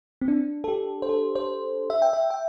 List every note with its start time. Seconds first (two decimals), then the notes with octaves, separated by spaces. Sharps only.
0.21 C4
0.28 D4
0.64 A4
0.68 G4
1.02 C5
1.09 A4
1.35 C5
1.90 E5
2.02 G5
2.13 E5
2.30 G5